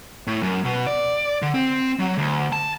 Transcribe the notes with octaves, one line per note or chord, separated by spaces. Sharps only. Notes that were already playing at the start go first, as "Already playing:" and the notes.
A2
F#2
B2
D5
D3
C4
F#3
D2
A5